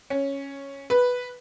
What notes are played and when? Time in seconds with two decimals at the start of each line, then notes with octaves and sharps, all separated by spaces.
0.10 C#4
0.90 B4